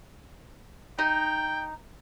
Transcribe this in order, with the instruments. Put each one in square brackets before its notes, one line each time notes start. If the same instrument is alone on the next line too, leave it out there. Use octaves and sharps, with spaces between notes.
[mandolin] D#4 [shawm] G5